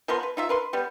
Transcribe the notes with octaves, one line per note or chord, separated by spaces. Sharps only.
F3 B3 A#4 C6
B4
D#4 F4 E5
A#4 B4 C6
G3 B3